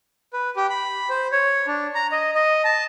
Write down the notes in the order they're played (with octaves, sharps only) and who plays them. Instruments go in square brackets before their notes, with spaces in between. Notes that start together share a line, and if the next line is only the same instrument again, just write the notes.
[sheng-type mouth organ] B4
G4
B5
C5
C#5
D4
A#5
D#5
D#5
A5